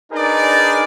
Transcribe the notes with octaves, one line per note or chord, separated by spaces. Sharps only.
D4 D#4 G#4 A#4 B4 D5